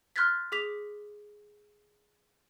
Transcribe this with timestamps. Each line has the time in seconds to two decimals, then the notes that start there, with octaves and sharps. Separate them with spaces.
0.16 C6 F6 F#6 G#6 A6 B6
0.52 G#4 D6 B6 F7